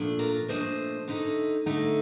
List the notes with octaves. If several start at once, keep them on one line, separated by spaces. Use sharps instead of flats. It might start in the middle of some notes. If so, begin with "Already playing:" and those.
Already playing: A#2 F3 A3 D4
A#4 D5
A#2 F3 A3 D4 C5 D#5
D3 A3 D#4
D3 A3 D#4